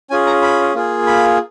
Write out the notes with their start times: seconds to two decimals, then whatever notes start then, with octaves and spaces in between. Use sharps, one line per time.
0.10 C#4 F4 G#4 G#5
0.26 A#5
0.42 B5
0.74 A#3 F4 G#4
1.07 B5